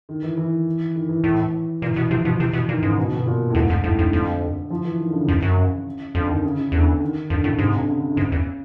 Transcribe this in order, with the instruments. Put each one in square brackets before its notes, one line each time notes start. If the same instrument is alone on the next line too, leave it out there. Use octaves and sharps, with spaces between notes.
[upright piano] D#3
E3
E3
D#3
E3
[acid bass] A2
[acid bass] A#2 [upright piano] E3
[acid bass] B2
[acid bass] C3 [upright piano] F3
[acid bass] B2 [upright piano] F3
[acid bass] C3 [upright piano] E3
[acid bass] B2
[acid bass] A#2 [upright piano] D#3
[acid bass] G#2 [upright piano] C#3
[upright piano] B2
B2
A#2
A2
[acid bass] E2 [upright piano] G#2
[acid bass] F2
[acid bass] F2 [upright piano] A2
[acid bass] F2 [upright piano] D3
[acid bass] F2
[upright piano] F3
E3
D#3
D3
C#3
C3
[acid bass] F2 [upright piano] C#3
[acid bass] F#2
[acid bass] F2 [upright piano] D3
[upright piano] D#3
C#3
C#3
[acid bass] E2 [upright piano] D3
[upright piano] D#3
[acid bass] F2 [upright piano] D3
[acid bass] A2 [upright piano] C#3
[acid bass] G#2 [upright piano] C3
[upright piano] D3
C#3
D3
C#3
[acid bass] G#2
E2